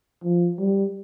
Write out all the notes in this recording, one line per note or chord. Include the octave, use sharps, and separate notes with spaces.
F3
G3